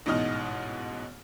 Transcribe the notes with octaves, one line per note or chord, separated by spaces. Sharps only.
A1 G#2 B2 D#4 D#5 F6